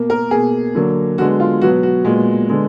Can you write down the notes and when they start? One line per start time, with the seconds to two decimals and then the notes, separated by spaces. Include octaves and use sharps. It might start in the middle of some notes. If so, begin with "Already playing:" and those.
Already playing: B2 A#3
0.10 A#4
0.31 B2 A#3 G#4
0.75 D3 F#3 A#3
1.18 D3 G#3 B3 F#4
1.40 F4
1.61 B2 F#3 B3 F#4
1.83 F#4
2.05 A#2 G#3 B3
2.49 D3 G#3 B3